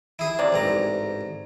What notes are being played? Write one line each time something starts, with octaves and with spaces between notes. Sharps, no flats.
E4 G#4
C3 D5
A1 G#2 A#5